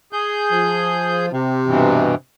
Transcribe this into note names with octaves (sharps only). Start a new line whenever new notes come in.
G#4 G6
F3
C3
G2 B2 E3